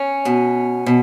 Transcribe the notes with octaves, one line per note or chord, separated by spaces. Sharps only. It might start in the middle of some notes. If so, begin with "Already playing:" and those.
Already playing: C#4
B2
B2